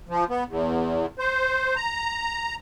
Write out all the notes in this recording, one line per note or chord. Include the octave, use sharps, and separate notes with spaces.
F3
B3
E2
C5
A#5